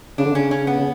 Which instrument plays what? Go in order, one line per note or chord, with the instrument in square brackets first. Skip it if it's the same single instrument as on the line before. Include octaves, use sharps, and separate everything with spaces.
[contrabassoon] C#3 [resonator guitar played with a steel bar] D4
[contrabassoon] D3
[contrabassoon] C#3 [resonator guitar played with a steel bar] C#4
[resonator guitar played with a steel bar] C#4
B3
[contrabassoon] C#3